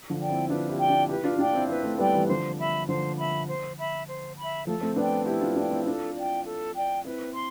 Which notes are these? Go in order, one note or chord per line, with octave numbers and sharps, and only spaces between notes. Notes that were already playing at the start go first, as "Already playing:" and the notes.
D3 F3
D5 G5
C4 E4
D4 F4 B4
E4 G4
D5 G5
D4 F4
E4 G4 B4
D4 F4
D4 F4 D5 G5
C4 E4
C4 E4 B4
A3 C4
G3 B3 D5 G5
E3 G3
D3 F3 C5
E5 B5
D3 F3 C5
E5 B5
C5
E5 B5
C5
E5 B5
F3 A3 A4
A3 C4
B3 D4 D5 G5
E4 G4 A4
D4 F4
D4 F4 D5 G5
C4 E4
D4 F4 A4
D5 G5
A4
D5 G5
C4 E4 B4
C6